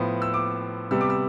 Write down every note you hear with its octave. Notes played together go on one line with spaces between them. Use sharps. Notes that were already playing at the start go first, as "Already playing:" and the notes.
Already playing: A2 F3 B3
E6
D6
C3 G3 B3 E6
D6
E6